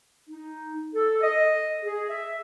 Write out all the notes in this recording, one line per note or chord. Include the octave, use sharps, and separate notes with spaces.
D#4
A4
D#5
G#4
E5